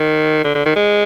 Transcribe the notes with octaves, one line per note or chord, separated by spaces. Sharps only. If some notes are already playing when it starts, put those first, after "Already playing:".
Already playing: D#3
D3
D3
D#3
G#3